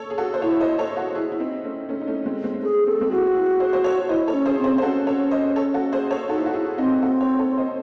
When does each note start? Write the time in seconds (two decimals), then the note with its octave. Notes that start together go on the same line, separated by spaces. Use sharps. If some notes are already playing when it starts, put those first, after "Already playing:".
Already playing: A4 C#5
0.10 G#4
0.18 F#4 A4
0.34 C5
0.42 E4 A4 C#5
0.61 C5 D#5
0.79 A4 C#5
0.97 F#4 A4
1.15 E4 G#4
1.32 E4
1.40 C4 D#4
1.64 A3 C#4
1.89 A3 C#4
2.01 D#4
2.07 A3 C#4
2.26 G#3 C4
2.43 G#3 C4
2.54 C4
2.62 A3 G#4
2.87 C4 A4
2.94 A3
3.01 G#3 C4
3.11 E4 F#4 G#4
3.35 E4 G#4
3.60 G#4 C5
3.73 C5
3.84 A4 C#5
4.09 E4 C5 D#5
4.27 A4 C#5
4.34 C#4
4.46 G#4 C5
4.58 C4
4.64 G#4 C5
4.78 C5
4.82 C#4 F#4 A4
5.07 A4 C#5
5.31 C5 D#5
5.56 A4 C#5
5.74 F#4 A4
5.92 G#4 C5
6.11 A4 C#5
6.29 D#4 F#4 A4
6.38 E4
6.46 F#4
6.53 E4 G#4
6.78 C4 D#4 F#4
7.02 F#4 A4
7.20 A4 C#5
7.39 A4 C#5
7.57 C5 D#5